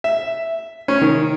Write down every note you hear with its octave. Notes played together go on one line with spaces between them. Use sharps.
E5
C#4
D#3